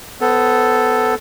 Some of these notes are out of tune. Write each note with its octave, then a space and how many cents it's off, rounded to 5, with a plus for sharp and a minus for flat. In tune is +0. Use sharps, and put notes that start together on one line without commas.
B3 +20 A4 +0 C5 +35